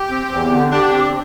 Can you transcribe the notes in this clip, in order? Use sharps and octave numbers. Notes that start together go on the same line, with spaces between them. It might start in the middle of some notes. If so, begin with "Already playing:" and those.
Already playing: G4
C4
E2
D3
D4 G4
C4